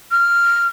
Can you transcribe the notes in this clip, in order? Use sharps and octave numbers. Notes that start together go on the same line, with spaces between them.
F6